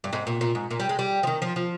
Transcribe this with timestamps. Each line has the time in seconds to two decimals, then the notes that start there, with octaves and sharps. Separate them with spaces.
0.04 G2
0.13 G#2
0.27 A#2
0.41 A#2
0.55 G#2
0.71 A#2
0.80 G3
0.89 G#3
0.99 G3
1.23 F3
1.27 D#3
1.42 F3
1.56 F3